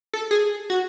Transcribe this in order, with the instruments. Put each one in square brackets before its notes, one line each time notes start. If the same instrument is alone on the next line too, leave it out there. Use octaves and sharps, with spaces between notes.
[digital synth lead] A4
G#4
F#4